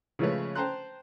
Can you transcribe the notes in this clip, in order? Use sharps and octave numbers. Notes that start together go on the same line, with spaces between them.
C#3 F3 G#3 A3 B4 C#5
C5 G5 A5 A#5 C6 F#6